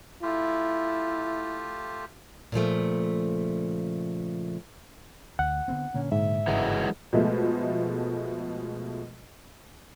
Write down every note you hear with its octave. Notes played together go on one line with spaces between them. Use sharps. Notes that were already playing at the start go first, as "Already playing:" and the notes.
A3 E4 F4 G4
A#2 C#3 F3 A3
D2 F#5
D3 B3 C4
A#2 D3 A#3 C#4
G#2 E5
G1 C#3 E3 F#3 G#3
B2 F3 G#3 A3